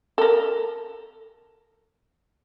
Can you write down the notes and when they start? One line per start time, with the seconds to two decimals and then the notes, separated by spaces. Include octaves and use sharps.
0.18 A4 A#4